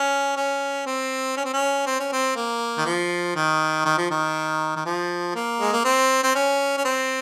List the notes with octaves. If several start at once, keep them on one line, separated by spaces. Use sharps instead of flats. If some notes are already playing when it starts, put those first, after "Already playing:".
Already playing: C#4
C#4
C4
C#4
C4
C#4
C4
C#4
C4
A#3
D#3
F3
D#3
D#3
F3
D#3
D#3
F3
A#3
G#3
A#3
C4
C4
C#4
C#4
C4